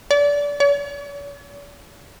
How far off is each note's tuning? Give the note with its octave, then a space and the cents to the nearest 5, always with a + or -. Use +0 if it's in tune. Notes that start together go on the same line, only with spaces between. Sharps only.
D5 -25
D5 -45